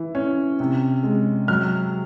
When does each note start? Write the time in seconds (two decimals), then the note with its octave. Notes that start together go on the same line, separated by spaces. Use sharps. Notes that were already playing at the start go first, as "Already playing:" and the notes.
Already playing: E3
0.15 C#4
0.60 C3
1.03 G#3
1.48 F#3 F6